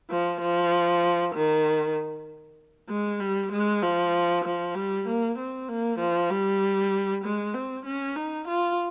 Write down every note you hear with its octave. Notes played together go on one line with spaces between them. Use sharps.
F3
F3
D#3
G#3
G3
G#3
F3
F3
G3
A#3
C4
A#3
F3
G3
G#3
C4
C#4
D#4
F4